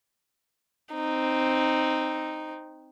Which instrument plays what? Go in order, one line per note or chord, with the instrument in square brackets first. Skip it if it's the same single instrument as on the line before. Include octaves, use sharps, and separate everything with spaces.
[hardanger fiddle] C4 D#4